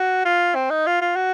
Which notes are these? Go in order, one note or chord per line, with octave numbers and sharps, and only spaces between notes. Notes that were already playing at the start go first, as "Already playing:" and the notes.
Already playing: F#4
F4
C4
D#4
F4
F4
F#4